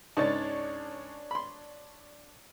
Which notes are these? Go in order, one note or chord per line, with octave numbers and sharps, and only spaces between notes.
C#2 G#2 D4 C#5 A6
B5 C6